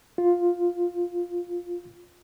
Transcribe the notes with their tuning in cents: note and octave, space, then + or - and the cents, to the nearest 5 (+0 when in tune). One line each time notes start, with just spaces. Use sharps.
F4 +5